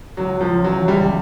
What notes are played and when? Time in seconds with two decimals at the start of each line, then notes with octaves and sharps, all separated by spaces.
0.17 C#2 F#3
0.41 C#2 F3
0.64 E3 F#3
0.88 C#2 G3